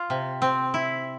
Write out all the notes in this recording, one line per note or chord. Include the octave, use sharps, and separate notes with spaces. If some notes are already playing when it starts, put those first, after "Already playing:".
Already playing: F4
C3
C4
E4